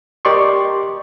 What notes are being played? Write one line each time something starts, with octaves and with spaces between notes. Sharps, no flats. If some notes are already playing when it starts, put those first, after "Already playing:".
G4 A#4 D5 D#5 C6 C#6